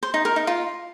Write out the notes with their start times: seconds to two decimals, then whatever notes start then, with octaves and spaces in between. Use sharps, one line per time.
0.03 C5
0.14 D#4
0.25 A#4
0.36 D#4
0.47 F4